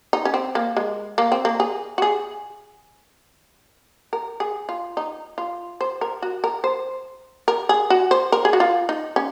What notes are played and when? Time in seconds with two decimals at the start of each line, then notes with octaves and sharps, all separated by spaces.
0.13 D#4
0.25 C#4
0.34 C4
0.55 A#3
0.77 G#3
1.18 A#3
1.32 C4
1.45 A#3
1.60 G#4
1.98 F#4
2.02 G#4
4.13 A#4
4.40 G#4
4.69 F4
4.97 D#4
5.38 F4
5.81 C5
6.01 A#4
6.22 F#4
6.44 A#4
6.64 C5
7.48 A#4
7.69 G#4
7.90 F#4
8.11 C5
8.32 A#4
8.45 G#4
8.53 F#4
8.60 F4
8.89 D#4
9.16 C#4